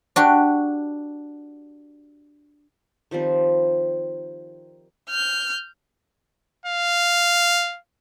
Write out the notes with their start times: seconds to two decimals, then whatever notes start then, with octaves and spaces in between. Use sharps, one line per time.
0.16 D4 F#4 G4
3.11 D#3 F3 G3 C4
5.10 F6 G6
6.66 F5